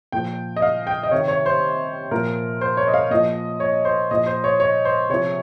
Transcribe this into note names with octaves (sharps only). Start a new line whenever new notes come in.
A#2 F3 G5
D#5
F5
G5
D#5
C3 D#3 C#5
C#5
C5
A#2 F3 A#4
C5
C#5
D#5
F5
A#2 F3 D#5
C#5
C5
A#2 F3 D#5
C5
C#5
C#5
C5
C3 F3 C#5